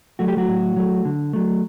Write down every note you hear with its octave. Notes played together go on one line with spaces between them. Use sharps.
F#3 A3 F#4
G4
F#3 F#4
A2
F#3 A3
D3
F#3 A3